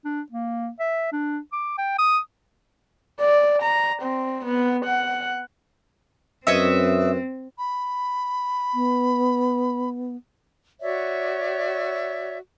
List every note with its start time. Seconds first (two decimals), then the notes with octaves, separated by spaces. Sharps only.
0.05 D4
0.32 A#3
0.80 E5
1.12 D4
1.52 D6
1.78 G5
1.99 D#6
3.21 D5
3.62 A#5
4.03 C4
4.45 B3
4.85 F#5
6.47 F#2 C4 B4 C#5 D#5 E5
7.58 B5
8.74 B3
10.80 F#4 C#5 D5 E5